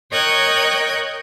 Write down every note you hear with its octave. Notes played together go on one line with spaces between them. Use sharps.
A#4 C#5 D#5 G5 F#6 G#6